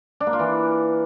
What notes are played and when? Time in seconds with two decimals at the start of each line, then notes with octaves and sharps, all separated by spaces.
0.20 D4
0.27 A#3
0.33 F4
0.39 E3